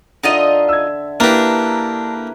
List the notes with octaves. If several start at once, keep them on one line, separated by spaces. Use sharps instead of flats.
D3 D#4 F4 D#5 E5
E6 G#6
A#3 D4 E4 G4 B4 A#5